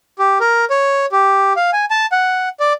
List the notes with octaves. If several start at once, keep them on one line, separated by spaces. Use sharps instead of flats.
G4
A#4
C#5
G4
F5
G#5
A5
F#5
D5